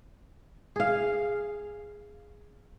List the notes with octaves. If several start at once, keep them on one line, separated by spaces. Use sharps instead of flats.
G#4 F5